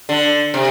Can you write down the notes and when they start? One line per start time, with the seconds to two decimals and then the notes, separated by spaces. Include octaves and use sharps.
0.09 D3
0.54 C3